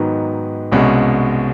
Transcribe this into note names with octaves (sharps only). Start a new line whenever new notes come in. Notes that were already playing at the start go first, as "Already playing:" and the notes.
Already playing: G#2 D#3 F#3 B3 D#4
C2 B2 G#3 C#4 F#4